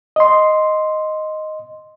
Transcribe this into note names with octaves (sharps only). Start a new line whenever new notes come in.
D#5 C6